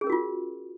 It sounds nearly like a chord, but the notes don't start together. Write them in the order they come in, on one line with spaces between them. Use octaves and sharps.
G#4 C#4 A#4 F#4 F4